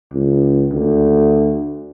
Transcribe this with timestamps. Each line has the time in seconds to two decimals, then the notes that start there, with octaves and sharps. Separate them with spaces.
0.13 C#2
0.73 D2